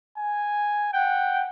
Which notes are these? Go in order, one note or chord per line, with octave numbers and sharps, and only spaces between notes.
G#5
F#5 G5